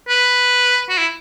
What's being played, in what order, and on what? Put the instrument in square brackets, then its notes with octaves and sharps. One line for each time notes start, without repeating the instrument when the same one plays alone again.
[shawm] B4
F#4
E4